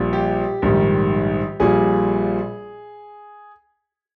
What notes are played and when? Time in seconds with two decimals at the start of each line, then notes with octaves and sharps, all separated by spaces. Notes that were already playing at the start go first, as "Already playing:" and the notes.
Already playing: A#1 A#2 G3
0.13 G4
0.62 A#1 G#2 D#3 G3
1.60 A#1 A#2 G3 G#4